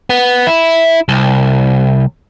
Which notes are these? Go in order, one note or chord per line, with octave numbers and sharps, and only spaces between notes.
B3
E4
C2